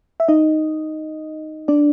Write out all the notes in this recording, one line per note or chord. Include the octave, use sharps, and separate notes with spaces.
E5
D#4 D#5
D4 D5